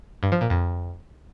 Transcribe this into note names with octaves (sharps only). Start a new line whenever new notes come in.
G2
F3
A#2
F2